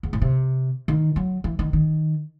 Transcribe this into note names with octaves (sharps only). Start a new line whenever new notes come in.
E2
A2
C3
D#3
F#3
E3
D#3
D#3